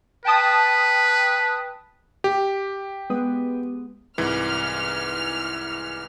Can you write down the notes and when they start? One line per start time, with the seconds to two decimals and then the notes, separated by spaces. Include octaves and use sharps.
0.25 B4 G5 A5 D#6
2.24 G4
3.10 G#3 B3 D#6
4.18 C2 G#2 E3 F6